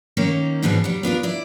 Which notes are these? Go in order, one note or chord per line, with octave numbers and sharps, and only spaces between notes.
D#3 A#3 C#4 D#4
G#2 B2 E3 G#3 C#4 D4
F#3 G3
B3 D4 F4 A#4
E4 D5